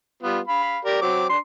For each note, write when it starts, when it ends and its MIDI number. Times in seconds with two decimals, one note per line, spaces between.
0.23 0.40 55
0.23 0.40 59
0.23 0.40 65
0.47 0.78 77
0.47 0.78 83
0.85 0.99 67
0.85 0.99 70
0.85 0.99 74
1.02 1.27 54
1.02 1.27 60
1.02 1.27 86
1.30 1.38 62
1.30 1.38 84